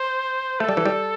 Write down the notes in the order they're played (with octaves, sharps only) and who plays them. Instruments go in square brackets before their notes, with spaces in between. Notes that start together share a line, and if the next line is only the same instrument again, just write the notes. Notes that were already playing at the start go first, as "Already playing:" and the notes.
Already playing: [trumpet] C5
[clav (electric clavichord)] A3 [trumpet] A4
[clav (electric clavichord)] G3
E3
G3